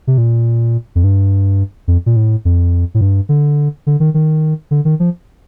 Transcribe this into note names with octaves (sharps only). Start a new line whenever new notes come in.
C3
A#2
F2
G2
F2
A#2
A2
F2
A2
G2
D3
D3
D#3
D#3
D3
D#3
F3